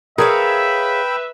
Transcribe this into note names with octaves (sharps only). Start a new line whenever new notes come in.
G#4 A#4 B4 C#5 E5 F5 G5 B5